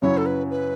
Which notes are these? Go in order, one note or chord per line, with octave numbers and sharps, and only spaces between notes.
F#2 C#3 F#3 C#4 E4 C#5
A4
B4
B4